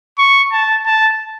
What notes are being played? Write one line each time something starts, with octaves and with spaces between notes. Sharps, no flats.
C#6
A5
A5